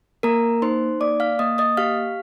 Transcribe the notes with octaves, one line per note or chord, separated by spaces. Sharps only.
A#3 A#4 A#5
D#4 C5 C6
A#3 D5 D6
F5 F6
A#3 D#5 D#6
D#5 D#6
G4 F5 F6